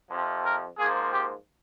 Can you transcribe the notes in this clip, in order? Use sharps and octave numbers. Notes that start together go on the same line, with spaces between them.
F2 C3 F3
A#4
G#2 F3 A#3 G#4
G4